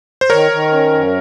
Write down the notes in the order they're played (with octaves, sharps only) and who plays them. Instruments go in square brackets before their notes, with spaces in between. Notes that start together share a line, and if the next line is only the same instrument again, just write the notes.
[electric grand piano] C5
[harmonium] D#3 [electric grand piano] A#4 C#5
[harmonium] D#3
C#4
F#2